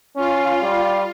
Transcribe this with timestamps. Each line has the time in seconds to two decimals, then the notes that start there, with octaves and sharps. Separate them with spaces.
0.16 C#4 F4
0.62 G3